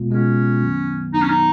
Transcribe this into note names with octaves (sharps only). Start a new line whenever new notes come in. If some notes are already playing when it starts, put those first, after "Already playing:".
Already playing: B2 G#3 B3 F4
B2 G#3 B3 C#4 F4
F#2 D#3 F#3 B3
F#2 D#3 F#3 B3 D#4
C#4
D#4